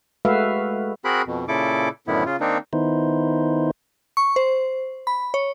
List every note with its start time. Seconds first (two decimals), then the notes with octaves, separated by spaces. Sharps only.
0.25 G#3 A3 F#4 B4 E5 F5
1.05 C4 F#4 G#4 A#4 B5 F#6
1.26 F2 B2
1.48 A#2 C#3 E4 A4 D6
2.07 F#2 A2 D3 D#3 B3 E4
2.26 C#3 F4
2.40 D#3 A#3 C4 D4 D#4
2.73 D#3 B3 D#4 E4 C5
4.17 C#6
4.36 C5
5.07 B5
5.34 C#5